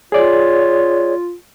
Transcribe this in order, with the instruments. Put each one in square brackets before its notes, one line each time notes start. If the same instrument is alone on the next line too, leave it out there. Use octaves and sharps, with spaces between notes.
[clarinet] F4 [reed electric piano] G#4 D5 [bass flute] C#5